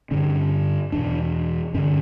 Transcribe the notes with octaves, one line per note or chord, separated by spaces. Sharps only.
G2 D3 C#4
E2 B2 D4
G2 D3 C#4